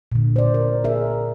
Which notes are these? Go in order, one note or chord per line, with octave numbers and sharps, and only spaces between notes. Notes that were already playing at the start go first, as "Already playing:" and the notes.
A#2 D3
C5 D5
A#4
G#4 A#4 E5